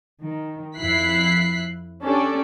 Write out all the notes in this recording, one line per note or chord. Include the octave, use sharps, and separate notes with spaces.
D#3
F2 E4 F#6 B6 C7
C#4 D4 G4 A4 D5